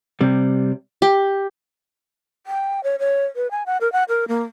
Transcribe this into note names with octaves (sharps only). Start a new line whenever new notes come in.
C3 G3
G4
G5
C#5
C#5
B4
G#5
F#5
A#4
F#5
A#4
A#3